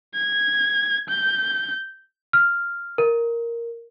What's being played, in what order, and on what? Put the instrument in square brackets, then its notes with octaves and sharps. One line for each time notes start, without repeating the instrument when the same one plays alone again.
[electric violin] G#6
G6
[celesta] F6
A#4